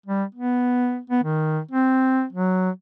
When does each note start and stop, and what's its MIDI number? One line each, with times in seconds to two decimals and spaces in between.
0.06 0.24 55
0.35 1.00 59
1.10 1.23 59
1.24 1.60 51
1.71 2.25 60
2.33 2.70 54